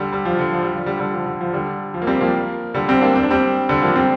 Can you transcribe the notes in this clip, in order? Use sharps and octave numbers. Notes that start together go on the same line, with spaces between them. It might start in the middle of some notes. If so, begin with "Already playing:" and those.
Already playing: D3 G3
G3
F3
D3
F3
G3
F3
D3 G3
D3 G3
F3
D3
F3
D3 G3
F3
A#3
G3 C4
F3 A#3
D3 G3
G3 C4
A#3 D4
C4
D4
G3 C4
D3 G3
F3 A#3
G3 C4